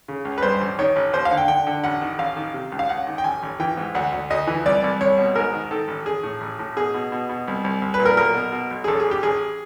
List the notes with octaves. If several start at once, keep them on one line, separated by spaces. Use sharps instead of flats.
C#3
C#2
B4
G2 C5
A1
D#3 C#5
A1
D#2 C5
F5
D3
G5
D3 G5
D3
A1 F#5
D#3
A1 F5
D#3
C3
C#2
F5
C#2 F#5
D#3
G5
A1 G#5
A1
E3 G5
G#2
D2 F#5
D2
D2 D#5
E3
C2 D5
C2
C2 C#5
B2
G#2 A#4
D#3
D#3 A4
A1
A1 G#4
A2
A1
A2
B2 G#4
B2
B2
B2
C2
C2
C2
B4
A#2
A#4
B1 A#4
B2
B2
B1
G#4
A1 A4
G#4
A1
G4
A1 G#4